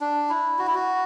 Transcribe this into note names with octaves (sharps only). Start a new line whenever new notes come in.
D4
E4
F#4
E4
F#4